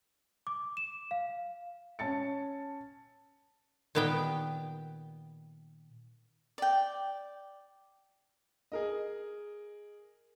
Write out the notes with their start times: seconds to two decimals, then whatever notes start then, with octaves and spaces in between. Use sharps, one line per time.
0.47 D6
0.77 E7
1.11 F5
1.99 C#4 A5 A6 C#7
3.95 A#2 D#3 B3 G4 G5
6.58 D5 G5
8.72 G#4 A#4 D#5